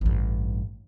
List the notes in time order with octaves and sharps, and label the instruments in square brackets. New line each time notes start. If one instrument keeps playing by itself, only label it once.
[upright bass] A1 G2